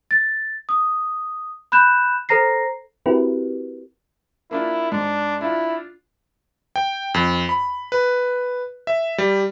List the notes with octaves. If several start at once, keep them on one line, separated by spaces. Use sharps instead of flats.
A6
D#6
B5 F#6 G6 E7
A4 C5 A#5 A#6 C7
C4 E4 F#4 G4 A#4 B4
A#3 D4 E4 F4
G#2 D4
D4 E4 F4
G5
F2
B5
B4
E5
G3